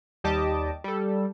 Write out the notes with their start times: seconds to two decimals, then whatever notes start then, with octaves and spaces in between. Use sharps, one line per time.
0.24 D#2 G3 G4 D#5 A5 D6
0.84 G3 A4